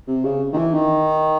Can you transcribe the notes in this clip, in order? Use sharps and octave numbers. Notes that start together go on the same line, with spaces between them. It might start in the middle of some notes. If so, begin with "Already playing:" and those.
C3
C#3
D#3
E3
D#3